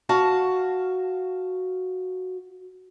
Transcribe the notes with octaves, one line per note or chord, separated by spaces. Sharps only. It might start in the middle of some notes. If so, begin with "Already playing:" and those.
F#4 F5 A5